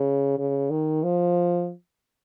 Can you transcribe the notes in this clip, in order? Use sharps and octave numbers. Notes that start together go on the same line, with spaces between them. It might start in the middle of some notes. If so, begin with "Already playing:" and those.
Already playing: C#3
C#3
D#3
F3